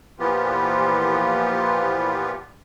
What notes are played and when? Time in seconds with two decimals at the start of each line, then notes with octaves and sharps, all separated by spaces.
0.19 A#2 E3 F3 B3 F4 G4